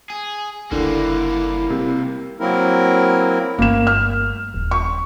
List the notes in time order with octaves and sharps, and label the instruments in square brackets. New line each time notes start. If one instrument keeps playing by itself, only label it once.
[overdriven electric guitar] G#4
[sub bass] F#1 [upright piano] D3 [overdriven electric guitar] G3 A#3 [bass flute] E4
[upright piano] C3
[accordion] F#3 A#3 C4 E4 A#4
[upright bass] G1 A3 [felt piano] A#3 E7
[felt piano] F6
[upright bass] D#1
[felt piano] C#6